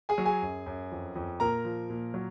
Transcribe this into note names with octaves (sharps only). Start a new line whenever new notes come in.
G#4 G#5
F#3
G#4 G#5
F#2
F#2
F2
F2
A#2 A#4 A#5
F3
A#2
F#3